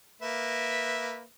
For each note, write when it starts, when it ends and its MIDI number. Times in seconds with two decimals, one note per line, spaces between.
0.22 1.23 58
0.22 1.23 71
0.22 1.23 76